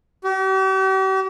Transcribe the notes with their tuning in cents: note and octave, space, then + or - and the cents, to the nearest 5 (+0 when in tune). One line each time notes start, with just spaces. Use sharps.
G4 -45